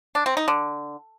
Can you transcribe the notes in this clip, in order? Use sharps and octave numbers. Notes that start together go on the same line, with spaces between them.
D4
C4
D#4
D3